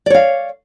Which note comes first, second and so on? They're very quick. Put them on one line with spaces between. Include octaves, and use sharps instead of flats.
D5 C#5 F5